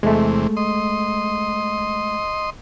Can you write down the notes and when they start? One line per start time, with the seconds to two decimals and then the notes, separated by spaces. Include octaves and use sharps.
0.03 E2 C3 G#3 A3
0.57 D#5 C6